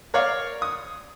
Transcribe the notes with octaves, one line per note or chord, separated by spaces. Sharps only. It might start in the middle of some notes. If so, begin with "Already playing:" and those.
A#4 C#5 D5 F5
D#6